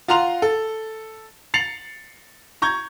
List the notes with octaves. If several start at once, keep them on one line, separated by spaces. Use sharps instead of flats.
F4 F#5 A#5 C6 F7
A4
A6 C7 C#7 F7 F#7
A#5 C#6 G6 G#6